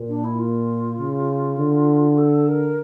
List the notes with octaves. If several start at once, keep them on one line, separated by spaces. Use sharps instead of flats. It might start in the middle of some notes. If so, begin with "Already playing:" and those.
Already playing: A#2
D4
E4
F4
C#3
D3
A4
A#4